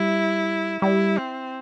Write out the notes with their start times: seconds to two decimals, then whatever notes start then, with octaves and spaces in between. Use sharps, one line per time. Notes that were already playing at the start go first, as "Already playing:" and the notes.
Already playing: G3 E4
0.82 G3 E4
1.17 C4